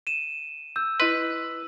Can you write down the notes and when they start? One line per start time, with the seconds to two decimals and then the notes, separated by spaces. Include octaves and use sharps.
0.07 D#7 E7
0.76 E6 G6
1.00 E4 B4 D#5 C6